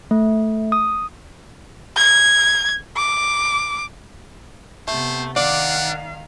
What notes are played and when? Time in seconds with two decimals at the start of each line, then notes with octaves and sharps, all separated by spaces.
0.11 A3
0.72 D#6
1.97 G#6
2.97 D6
4.88 C3 A3 B3 C5
5.36 D#3 D4 D5 F5 F#5